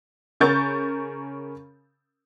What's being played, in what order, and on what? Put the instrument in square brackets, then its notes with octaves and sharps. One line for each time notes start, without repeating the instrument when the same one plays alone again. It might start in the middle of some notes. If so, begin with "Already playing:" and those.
[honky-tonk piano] C#3 C#4 A#4 C#6 G6 A6